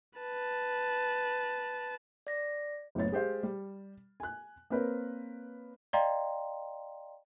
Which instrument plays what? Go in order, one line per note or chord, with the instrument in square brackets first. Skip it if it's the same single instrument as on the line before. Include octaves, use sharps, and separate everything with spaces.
[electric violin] B4 A5
[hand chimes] D5 A#6
[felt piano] F#1 A2 B3 C#5 A6
G#3 G4 C5 F5
G3
G#5 F#6
A#3 C4 A#4 B4 C#5
[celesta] D5 D#5 F5 G5 A#5 C6